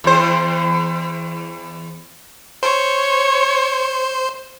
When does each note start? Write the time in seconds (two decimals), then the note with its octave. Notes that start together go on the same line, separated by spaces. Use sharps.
0.04 E2 C5
2.63 C5 C#5